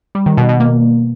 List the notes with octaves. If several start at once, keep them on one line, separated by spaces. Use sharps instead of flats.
G3
D#3
B2
B2
A#3